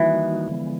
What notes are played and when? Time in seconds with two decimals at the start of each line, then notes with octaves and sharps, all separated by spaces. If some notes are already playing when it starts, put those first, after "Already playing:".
Already playing: D#3 E3 G3 A#3 D#4 F#4
0.48 D3 F3 G#3 B3